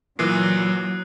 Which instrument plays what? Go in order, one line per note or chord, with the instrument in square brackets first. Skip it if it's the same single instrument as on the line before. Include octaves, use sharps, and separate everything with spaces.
[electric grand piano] A#2 E3 [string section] F#3 [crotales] D#6 F#6 C7